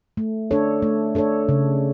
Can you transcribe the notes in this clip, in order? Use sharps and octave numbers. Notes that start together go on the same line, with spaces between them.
A3
D4 A4 C#5
A3
D4 A4 C#5
C#3